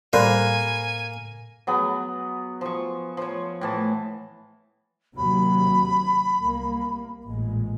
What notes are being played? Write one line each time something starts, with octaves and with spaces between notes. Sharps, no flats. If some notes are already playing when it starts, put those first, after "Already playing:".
A2 G3 A#3 C5 G#5 B5 F#6
F#3 B3 G#4
F3 C#6
F3 C#5
A2 E3 A5
D#2 C3 F#3 B5
C2 A#3
A1 A#2 G#3